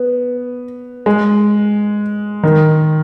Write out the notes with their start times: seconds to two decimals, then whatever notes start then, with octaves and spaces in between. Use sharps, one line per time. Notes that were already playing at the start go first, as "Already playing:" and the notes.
Already playing: B3
1.06 G#3
2.43 D#3